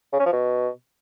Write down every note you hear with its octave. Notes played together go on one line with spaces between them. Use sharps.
C#3
C#4
F3
B2